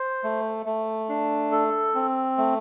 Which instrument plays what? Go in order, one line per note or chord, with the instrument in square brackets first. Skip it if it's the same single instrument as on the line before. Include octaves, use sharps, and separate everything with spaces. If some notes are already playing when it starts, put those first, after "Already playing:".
Already playing: [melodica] C5
A3
A3
D4
A4
C4
A3